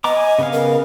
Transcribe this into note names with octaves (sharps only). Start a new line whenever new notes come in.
B3 D#5 A#5 D6
G#5
C#3 B3 F5
A#4